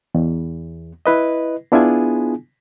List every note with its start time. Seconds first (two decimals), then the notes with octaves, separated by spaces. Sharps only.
0.14 E2
1.06 E4 B4 D#5
1.72 B3 D4 E4 F4 G#4 G#5